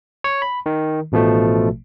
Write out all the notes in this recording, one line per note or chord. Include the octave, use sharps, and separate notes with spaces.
C#5
B5
D#3
A1 B2 F3 A3